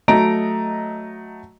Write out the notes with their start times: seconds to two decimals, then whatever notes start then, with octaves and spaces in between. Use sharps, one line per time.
0.08 F#3 A3 D#5 A#5 D7